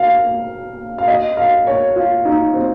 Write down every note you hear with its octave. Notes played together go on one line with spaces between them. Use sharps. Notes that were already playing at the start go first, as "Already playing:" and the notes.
Already playing: F5
F5
D#5
F5
C#5
F4
D#4
C4